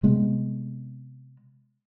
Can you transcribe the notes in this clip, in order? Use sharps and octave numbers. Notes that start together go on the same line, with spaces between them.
C3 G#3 B3